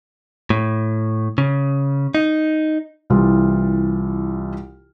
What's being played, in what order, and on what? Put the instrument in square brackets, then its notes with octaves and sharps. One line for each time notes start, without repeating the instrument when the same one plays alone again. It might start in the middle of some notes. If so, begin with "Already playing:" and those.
[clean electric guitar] A2
C#3
D#4
[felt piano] C2 E3 F4